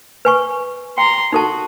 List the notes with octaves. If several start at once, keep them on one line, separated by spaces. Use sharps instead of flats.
B4 G#5 C#6
G5 A#5 C6
D#4 F#4 A4 A5